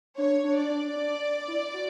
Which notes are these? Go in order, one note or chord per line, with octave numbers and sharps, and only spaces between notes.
D4 C#5
D4
D5
D4
D4
E4
F#4